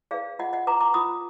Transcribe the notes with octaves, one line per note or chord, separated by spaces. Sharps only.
G#4 B4 D5 F5
F4 D#5 F#5
D#5 F#5
B4 A#5 D6
A#5 D6
F4 B5 D#6